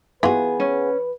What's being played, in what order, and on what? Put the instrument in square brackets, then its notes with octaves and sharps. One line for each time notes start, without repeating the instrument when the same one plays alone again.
[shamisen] E3 F4 F#4 [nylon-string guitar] B3 G#4 [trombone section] B4
[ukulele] C#4